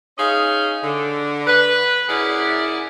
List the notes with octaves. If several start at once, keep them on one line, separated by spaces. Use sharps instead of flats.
C#4 D#4 G#4 D#5 F5
D3
B4
F#2 E4 G#4 A#4 D5 F#5